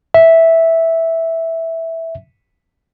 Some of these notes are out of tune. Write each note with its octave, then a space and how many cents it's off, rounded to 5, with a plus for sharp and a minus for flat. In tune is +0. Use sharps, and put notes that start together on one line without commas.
E5 -5